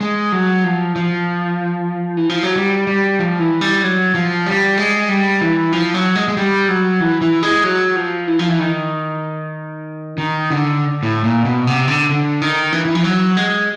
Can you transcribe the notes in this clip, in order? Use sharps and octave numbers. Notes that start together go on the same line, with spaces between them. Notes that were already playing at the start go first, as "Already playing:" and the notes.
G#3
F#3
F3
F3
E3
F3
F#3
G3
G3
F3
E3
G3
F#3
F3
G3
G#3
G3
E3
F3
F#3
G#3
G#3
G3
F#3
E3
E3
G#3
F#3
F3
E3
F3
E3
D#3
D#3
D3
A2
A#2
B2
C3
D3
D3
D#3
E3
E3
F3
F#3
G#3